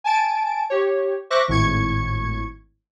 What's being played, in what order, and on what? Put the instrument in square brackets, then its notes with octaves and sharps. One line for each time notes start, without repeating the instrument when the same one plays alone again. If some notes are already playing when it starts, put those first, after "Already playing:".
[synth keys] G#5 A5 A6 D7
G4 C#5
C5 E5 C#6 D6 F#6 A#6
G#1 A2 C#6 G#6 C#7